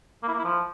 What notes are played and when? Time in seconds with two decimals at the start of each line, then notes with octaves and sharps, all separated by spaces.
0.23 A#3
0.28 E4
0.34 A#3
0.39 E4
0.44 F3